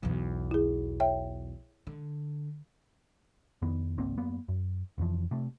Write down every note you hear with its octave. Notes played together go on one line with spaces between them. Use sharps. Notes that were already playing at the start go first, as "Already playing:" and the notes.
B1 E2
E4 G#4
C#5 E5 G5
D3
F2 D#3 B3
G#1 C#2 A#3 C4
F#2 A#3 B3
F#2
F1 F2 E3 F3
C3 A3